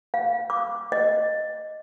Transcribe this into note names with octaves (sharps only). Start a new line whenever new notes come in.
F5
D6
D#5